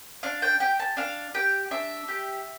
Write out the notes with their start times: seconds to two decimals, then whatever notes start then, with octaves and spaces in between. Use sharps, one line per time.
0.23 D4 F5
0.42 G5
0.60 G4 G5
0.79 A5
0.97 D4 F5
1.34 G4 G5
1.71 D4 E5
2.08 G4